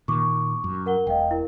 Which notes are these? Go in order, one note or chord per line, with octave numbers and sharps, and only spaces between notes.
A#2 D#3 C#6 D6
F#2
A#4 F#5 G7
E1 D#5 F5 G5
E4 A#4